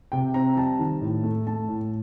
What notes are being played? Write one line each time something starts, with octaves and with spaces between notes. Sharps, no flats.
C3 G5
C4 A#5
G3 A5
D#3
A2
A3
A3 A5
A2